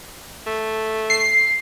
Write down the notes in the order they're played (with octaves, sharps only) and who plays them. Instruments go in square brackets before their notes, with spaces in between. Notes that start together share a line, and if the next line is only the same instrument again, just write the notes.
[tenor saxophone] A3
[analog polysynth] C7